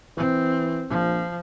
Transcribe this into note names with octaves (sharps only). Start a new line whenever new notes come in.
E3 C4
A#1 F3